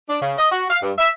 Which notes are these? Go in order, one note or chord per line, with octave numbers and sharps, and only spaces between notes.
D4
C#3
D#5
F#4
F5
G2
E5